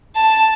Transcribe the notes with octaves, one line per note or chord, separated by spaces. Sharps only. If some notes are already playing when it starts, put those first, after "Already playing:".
A5